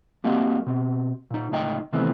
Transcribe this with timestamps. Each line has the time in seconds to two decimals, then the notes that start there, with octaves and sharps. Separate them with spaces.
0.24 G3 A#3 C4 F#4 A#4 D#5
0.66 B2 C4
1.31 A#2 D#4
1.51 C#2 A2 D#4 D#5 G5
1.93 C3 D#3 E3 A3 B3 C4